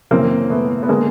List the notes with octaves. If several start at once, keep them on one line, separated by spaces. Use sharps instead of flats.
F#2 C#3 E3 A#3 C4
A3 B3
B3
D3 G#3 A#3